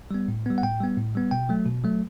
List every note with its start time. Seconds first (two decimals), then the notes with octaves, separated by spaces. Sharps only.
0.11 G3 B3
0.28 A2
0.46 G3 B3
0.58 F#5
0.63 A2 G5
0.80 G3 B3
0.97 A2
1.15 G3 B3
1.31 B2 G5
1.49 F#3 A3
1.66 B2
1.84 F#3 A3